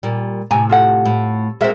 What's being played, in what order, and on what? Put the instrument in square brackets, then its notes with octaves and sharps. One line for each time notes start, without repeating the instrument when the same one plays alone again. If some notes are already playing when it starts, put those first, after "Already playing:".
[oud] A#2 G3
[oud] A2 C3 [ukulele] G#5 A#5
[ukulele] F4 A4 F#5
[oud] A2
[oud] G#3 A#3 C4 [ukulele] F#4 A#4 E5